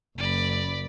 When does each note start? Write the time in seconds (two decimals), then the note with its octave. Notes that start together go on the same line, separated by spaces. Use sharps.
0.18 F#1 D5 B5